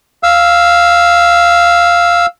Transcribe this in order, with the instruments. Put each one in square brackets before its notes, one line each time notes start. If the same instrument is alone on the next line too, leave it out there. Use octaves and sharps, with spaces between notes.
[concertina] F5 E6